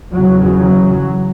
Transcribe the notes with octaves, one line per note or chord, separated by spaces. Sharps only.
E2 C#3 F#3
F#3